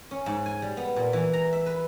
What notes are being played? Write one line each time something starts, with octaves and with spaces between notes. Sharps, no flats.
C#4
G#2
G#5
G3
B3
A#2
E3
A#5
E5
B4